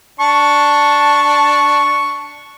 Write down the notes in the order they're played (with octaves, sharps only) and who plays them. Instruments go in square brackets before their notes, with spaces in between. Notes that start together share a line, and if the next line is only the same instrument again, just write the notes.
[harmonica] D4 A5 [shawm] C#6